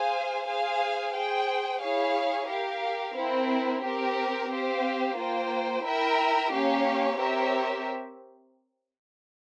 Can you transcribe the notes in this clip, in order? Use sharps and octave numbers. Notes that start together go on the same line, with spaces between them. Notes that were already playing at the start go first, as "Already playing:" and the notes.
Already playing: G#4 C5 F5 G#5
G#4 C5 F5 G#5
G#4 C5 G5
E4 G#4 C#5 F5
G4 A#4 F5
C4 E4 A#4
C4 G4 A#4
C4 G4 C5 F5
A#3 F4 C5 G5
E4 A#4 E5 G5
A#3 C#4 G4 C#5 F5
C4 G4 A#4 C#5 E5